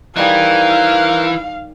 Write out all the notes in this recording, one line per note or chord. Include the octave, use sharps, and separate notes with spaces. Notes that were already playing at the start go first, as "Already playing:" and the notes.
D#3 E3 G3 G#4 A#4 C5 F5